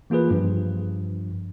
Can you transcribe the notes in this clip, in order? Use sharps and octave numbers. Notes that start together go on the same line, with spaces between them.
E3 A#3 F4 G#4 B4
G2 F3